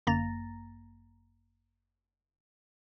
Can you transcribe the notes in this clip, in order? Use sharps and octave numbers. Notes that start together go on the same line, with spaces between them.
G1 F#2 A#3 A#5 A6 A#6